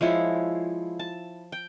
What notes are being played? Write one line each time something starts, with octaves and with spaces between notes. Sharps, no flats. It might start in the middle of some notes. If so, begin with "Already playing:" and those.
F3 G#3 E4 C#5
A5
G5